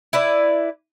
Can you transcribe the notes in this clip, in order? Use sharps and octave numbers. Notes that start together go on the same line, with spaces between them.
E4 B4 D5